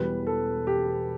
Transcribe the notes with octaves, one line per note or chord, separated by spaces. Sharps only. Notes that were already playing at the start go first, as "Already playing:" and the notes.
Already playing: E1 E2 B2 G3 B3 B4
A4
G4